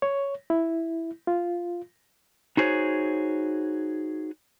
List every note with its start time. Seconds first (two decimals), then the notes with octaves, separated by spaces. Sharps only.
0.02 C#5
0.50 E4
1.27 F4
2.57 D#4 F#4 G#4 C5 C#5